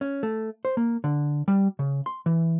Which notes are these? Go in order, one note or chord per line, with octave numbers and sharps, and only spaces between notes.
C#4
A3
C5
A#3
D3
G3
C#3
C6
E3